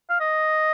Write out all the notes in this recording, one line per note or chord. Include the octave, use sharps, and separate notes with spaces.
F5
D#5